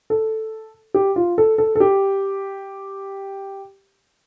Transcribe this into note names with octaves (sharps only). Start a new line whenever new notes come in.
A4
G4
F4
A4
A4
A4
G4